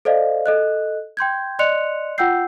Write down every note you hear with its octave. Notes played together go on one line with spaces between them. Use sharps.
A4 C5 D5 D#5 F5
A4 D#5 F#6
G5 C6 G6 G#6
D5 D#5 C6 F#6 C#7 F7
F4 F#5 G5 E6 G6 C7